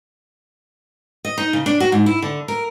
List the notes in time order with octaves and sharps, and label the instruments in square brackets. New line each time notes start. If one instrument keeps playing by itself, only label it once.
[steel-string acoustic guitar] D#5
D#4
C#3
D4
F#4
G#2
E4
D3
A#4